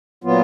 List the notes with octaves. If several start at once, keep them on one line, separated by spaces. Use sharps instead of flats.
A#2 F#3 B3 F4